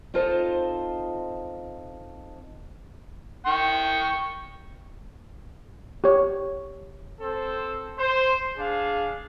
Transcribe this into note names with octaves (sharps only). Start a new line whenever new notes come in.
C4 D#4 F4 A4 C5 D#5
G5 C#6
G4 C#5
C4 A4 C5
C5
D4 G#4 F5